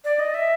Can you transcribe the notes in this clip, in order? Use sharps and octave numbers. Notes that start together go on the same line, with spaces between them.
D5
D#5
E5